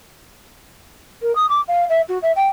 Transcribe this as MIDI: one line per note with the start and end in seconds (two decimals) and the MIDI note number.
1.21 1.34 70
1.35 1.46 87
1.49 1.60 86
1.68 1.84 77
1.89 2.00 76
2.08 2.18 66
2.22 2.31 76
2.36 2.47 79